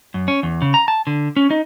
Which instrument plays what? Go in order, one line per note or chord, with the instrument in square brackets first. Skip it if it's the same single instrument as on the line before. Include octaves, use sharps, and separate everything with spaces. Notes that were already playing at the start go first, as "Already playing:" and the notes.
[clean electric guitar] F#2
C#4
E2
C#3
A#5
A5
D3
C#4
D#4